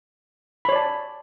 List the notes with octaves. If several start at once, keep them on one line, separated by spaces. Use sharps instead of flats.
C#5 D5 A5 B5